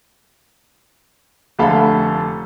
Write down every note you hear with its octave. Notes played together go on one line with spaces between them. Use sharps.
F1 D3 A3 A4 F5 B5